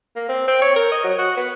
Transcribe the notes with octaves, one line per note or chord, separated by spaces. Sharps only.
A#3
C4
C4
C#5
A#4
D#5
F#3
F#4
B3